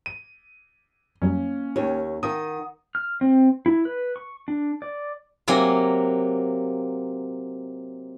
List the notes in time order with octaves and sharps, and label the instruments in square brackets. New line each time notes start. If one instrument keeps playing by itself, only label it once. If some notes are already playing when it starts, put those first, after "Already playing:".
[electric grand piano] D#7
[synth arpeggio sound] F#2 F#3 G3 [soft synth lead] A#3 [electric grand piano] C#4
[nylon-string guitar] D#2 C#5 [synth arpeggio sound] D#4
[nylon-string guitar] D#3 [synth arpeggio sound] F5 A5 [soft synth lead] F#5 [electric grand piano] D#6
[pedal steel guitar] F6
C4
E4
B4
C#6
D4
D5
[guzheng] C3 F#3 A#3 G#5